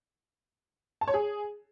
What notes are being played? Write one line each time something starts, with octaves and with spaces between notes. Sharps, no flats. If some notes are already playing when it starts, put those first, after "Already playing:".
A5
C#5
G#4